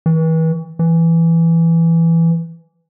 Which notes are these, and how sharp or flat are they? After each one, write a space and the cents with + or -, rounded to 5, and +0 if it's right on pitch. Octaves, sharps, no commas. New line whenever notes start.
E3 -35
E3 +10